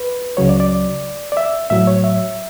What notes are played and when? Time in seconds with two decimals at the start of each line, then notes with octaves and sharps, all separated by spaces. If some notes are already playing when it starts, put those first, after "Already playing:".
Already playing: B4
0.37 C#2 C#3 F#3 C#5
0.49 D5
0.60 D5
1.32 D5
1.37 E5
1.70 A2 F#3 E5
1.87 C#5
2.04 E5